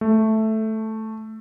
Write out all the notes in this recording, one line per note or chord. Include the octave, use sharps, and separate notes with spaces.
A3